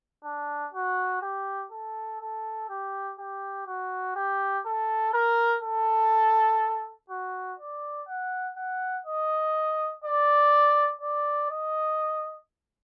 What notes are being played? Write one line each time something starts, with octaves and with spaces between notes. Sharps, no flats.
D4
F#4
G4
A4
A4
G4
G4
F#4
G4
A4
A#4
A4
F#4
D5
F#5
F#5
D#5
D5
D5
D#5